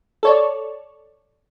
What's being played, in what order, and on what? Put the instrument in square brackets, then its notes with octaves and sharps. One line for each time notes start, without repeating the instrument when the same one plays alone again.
[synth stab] A4 C#5 D5